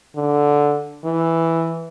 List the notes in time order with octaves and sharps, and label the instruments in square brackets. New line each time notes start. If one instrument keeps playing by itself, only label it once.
[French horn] D3
E3